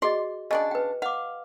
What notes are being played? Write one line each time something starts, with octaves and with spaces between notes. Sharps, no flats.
F#4 G#4 D5 D#5 C6
C#3 D4 D5 D#5 G5
B4 G5
F5 F#5 D6